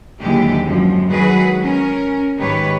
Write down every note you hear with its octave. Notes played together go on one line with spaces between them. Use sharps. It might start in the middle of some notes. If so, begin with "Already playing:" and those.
D#2 D3 E3 F#3 G#3 G4
F#2 F3
D#3 F#3 G#3 F#4 G#4 B4
C#4 A#4
G#2 D#3 G4 B4 C#5